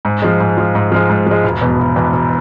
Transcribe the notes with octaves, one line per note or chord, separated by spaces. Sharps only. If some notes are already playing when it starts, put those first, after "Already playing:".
G#2
F3 G#3
G#2
F3 G#3
G#2
F3 G#3
G#2
F3 G#3
E1
E2 B2
E1
E2 B2
E1